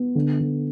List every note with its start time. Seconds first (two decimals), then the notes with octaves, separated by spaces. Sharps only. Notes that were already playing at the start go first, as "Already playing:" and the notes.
Already playing: B3
0.15 D3
0.40 D3